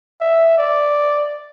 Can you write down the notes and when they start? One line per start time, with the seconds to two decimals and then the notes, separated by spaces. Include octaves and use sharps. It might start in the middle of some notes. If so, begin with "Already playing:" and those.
0.21 E5
0.58 D5